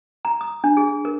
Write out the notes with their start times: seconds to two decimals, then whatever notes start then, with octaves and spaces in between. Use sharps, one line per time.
0.25 A#5
0.41 D#6
0.64 D4
0.77 G#4
1.05 A#4